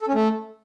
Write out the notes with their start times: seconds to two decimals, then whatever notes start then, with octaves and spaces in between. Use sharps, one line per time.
0.02 A4
0.08 C#4
0.15 A3